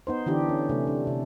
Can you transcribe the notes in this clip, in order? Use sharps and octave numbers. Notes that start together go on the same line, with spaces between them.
B3 D#4 C5
D3 E3 D4 G4
C#4
C3 A3
D4
C3